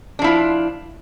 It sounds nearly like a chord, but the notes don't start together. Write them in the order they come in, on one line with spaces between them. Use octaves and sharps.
D4 F3 E4 F4